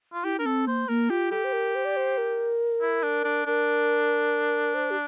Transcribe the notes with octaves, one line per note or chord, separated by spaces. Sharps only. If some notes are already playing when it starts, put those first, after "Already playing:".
F4
E4 G4
D4 A#4
C4 A4
A#3 C5
A#3 A#4
F4 G4
G4 A4
C5
A#4
C5
D5
C5
A#4
E4
D4
D4
D4 A#4
C5
G4